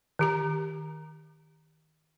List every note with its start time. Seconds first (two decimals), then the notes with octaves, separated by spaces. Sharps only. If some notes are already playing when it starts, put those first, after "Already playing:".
0.19 D#3 G4 A#5